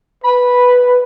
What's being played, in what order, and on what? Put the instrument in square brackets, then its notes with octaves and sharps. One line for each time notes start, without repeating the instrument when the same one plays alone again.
[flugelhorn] B4 [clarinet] B5